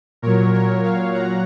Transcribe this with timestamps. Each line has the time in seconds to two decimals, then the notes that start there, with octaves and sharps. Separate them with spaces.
0.22 A#2 F#3 A#4 C#5
0.54 A#4 C#5
0.84 C#5 F5
1.14 F#5 A#5